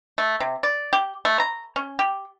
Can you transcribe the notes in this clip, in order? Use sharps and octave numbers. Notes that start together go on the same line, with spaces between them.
A3
C3
D5
G4
A3
A#5
C#4
G4